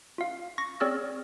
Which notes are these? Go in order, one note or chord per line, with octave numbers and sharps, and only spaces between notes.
F4 F5
C#6 A#6
C4 G#4 C#5 D5 E6 F6